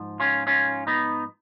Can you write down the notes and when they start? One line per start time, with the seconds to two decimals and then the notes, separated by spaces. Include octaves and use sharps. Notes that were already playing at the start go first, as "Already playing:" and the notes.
Already playing: G#2 F3
0.20 C#4 F4
0.47 C#4 F4
0.87 B3 D#4